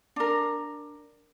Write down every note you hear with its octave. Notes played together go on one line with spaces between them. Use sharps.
D4 A#4